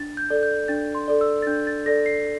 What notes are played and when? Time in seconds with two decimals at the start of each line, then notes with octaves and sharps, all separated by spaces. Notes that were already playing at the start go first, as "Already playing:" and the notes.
Already playing: D4 A6
0.17 G6
0.30 A4 D5
0.43 G6
0.68 D4 A6
0.95 C6
1.08 A4 D5
1.21 E6
1.42 A6
1.47 D4 G6
1.67 A6
1.86 A4 D5 A#6
2.06 C7